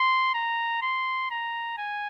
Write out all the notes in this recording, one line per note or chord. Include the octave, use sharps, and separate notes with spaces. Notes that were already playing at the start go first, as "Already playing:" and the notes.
Already playing: C6
A#5
C6
A#5
G#5